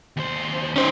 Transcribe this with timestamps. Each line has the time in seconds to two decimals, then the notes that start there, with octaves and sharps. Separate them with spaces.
0.17 D#2 C5
0.76 C#4 D#4 C5